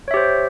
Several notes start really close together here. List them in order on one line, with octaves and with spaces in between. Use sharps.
C#5 E5 G4 C5